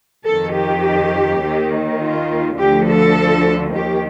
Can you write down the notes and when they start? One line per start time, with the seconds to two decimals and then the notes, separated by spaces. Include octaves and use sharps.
0.25 F2 D#3 A4
0.55 G4
1.41 D#2 D#3
1.99 F4
2.57 D2 D3 F3 G4
2.87 A4
3.74 D#2 D#3 G4